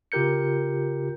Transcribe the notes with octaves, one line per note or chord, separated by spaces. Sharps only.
C#3 F4 G4 A#4 G6 C#7